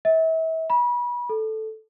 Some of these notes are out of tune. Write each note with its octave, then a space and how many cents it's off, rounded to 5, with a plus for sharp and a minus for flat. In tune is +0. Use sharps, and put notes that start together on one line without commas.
E5 -35
B5 -30
A4 -5